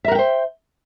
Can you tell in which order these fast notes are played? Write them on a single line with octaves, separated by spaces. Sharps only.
E5 A#4 F#5 G5 C5